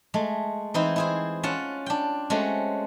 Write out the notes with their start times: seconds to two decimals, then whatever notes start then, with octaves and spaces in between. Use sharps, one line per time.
0.14 G#3 A3
0.74 E3 C4 D#4 E4 C5
0.96 E4 G#4 C5
1.43 C#4 F4 F#5 A5
1.86 D4 G5
2.30 G#3 A3 C4 C#4 F#4